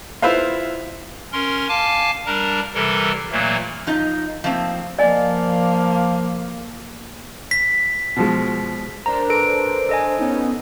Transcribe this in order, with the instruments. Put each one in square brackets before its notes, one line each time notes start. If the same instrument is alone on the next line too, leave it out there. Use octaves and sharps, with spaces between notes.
[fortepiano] E4 F4 B4 C5 F5
[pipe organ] C#4 A#4 C6
F5 G#5 A5 D6
G3 D4 A#4 A#5
C3 E3 G3 A4 A#4
A#2 E3 F#3 A3 A#3
[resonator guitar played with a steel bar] F3 D#4 F4 D#5
F3 A3 A#3 C4
[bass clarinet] F3 [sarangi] A#3 [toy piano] D5 D#5 G#5
[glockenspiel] B6
[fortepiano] B2 F3 G#3
[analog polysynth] D4 A#4 C5 [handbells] A#5
[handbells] A4 B4 D7
A4 D#5 G#5
[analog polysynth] B3 C#4 D#4